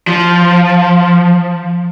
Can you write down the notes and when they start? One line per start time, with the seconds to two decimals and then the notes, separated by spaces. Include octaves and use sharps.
0.07 F3